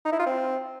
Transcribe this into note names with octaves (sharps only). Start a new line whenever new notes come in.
D#4
E4
F4
C4